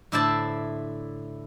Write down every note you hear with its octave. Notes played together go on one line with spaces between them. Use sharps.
A2 D3 E4 C5 D5 A5